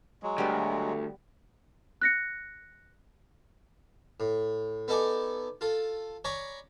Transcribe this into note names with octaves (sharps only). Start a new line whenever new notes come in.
F#3 G#3
D2 G3 B3
F#6 A#6 C#7
A2
B3 D#4 A4 D5 G#5
F4 A4
C#5 D5 G#5 A#5 B5 C#6